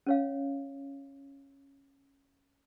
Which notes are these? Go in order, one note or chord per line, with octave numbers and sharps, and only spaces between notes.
C#4 C#5 F5